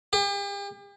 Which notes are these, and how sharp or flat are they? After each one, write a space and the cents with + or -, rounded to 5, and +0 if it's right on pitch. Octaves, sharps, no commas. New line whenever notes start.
G4 +40